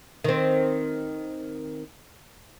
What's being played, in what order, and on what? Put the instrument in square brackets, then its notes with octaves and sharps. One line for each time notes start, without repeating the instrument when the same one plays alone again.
[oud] D#3 C4